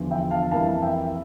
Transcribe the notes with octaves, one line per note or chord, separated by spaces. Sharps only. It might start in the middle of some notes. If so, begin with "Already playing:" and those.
Already playing: E2 D3 F3
E5 G5
F5 A5
F2 E3 G3 A#3 E4 F5 A5
E5 G5